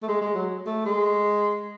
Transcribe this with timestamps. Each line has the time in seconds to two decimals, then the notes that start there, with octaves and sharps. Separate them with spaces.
0.03 A3
0.08 G#3
0.21 G#3
0.35 F#3
0.66 A3
0.86 G#3